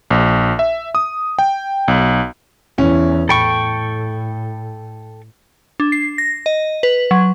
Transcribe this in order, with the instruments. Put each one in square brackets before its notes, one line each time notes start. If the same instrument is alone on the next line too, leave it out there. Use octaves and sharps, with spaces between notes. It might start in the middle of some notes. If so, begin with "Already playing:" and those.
[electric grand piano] A#1
E5
D#6
G5
B1
[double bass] E2 [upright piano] E3 C#4
[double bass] A2 [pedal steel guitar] A4 G5 C#6 [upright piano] B5
[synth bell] D4
C7
A#6
D#5
B4
F#3